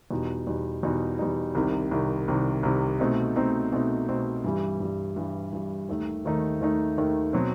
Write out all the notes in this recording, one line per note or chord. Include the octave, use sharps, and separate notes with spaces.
E2 B2 G3 D#4
E2 B2 G3 D#4
E2 B2 G3 D#4
E2 B2 G3 D#4
C2 C3 D#3
C2 C3 D#3
C2 C3 D#3
C2 C3 D#3
B2 A3 C4 D#4
B2 A3 C4 D#4
B2 A3 C4 D#4
B2 A3 C4 D#4
G2 E3 G3
G2 E3 G3
G2 E3 G3
G2 E3 G3
D#2 D#3 A3 D#4
D#2 D#3 A3 D#4
D#2 D#3 A3 D#4
D#2 D#3 A3 D#4
B2 F#3 C4